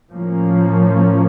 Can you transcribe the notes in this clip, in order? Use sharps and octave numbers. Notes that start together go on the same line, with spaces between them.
A2 F3 A#3 C#4